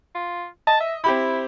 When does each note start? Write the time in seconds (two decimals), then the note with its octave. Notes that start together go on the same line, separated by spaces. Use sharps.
0.15 F4
0.67 D#5 A5
0.80 E5
1.04 C4 E4 G4 B5